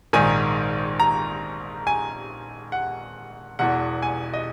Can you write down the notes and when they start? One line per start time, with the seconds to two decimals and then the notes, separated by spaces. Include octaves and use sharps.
0.13 A#1 G#2 D#3 G#5
1.00 A#5
1.87 G#5
2.72 F#5
3.59 E1 E2 B2 F#5
4.03 G#5
4.33 D#5